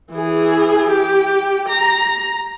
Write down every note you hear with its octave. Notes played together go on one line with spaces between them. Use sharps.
E3 G#4
G4
A#5